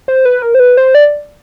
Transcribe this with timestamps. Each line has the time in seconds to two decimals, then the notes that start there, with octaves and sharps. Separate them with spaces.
0.08 C5
0.25 B4
0.42 A#4
0.55 C5
0.60 B4
0.77 C5
0.95 D5